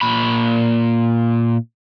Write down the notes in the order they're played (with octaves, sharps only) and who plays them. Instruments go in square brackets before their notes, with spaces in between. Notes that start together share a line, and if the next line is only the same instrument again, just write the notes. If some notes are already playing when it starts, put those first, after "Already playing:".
[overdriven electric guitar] A#2 B5